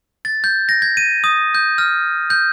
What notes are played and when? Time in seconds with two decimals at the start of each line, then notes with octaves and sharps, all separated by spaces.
0.25 A6
0.44 G6
0.69 A#6
0.82 G#6
0.97 D#7
1.24 D#6
1.55 G6
1.78 F6
2.30 G6